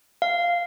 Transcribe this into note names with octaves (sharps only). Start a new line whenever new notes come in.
F5